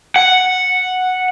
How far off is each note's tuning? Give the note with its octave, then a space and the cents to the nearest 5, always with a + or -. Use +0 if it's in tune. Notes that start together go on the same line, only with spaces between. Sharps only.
F#5 -5